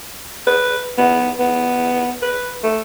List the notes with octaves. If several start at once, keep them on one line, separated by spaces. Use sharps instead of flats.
B4
B3
B3
B4
A3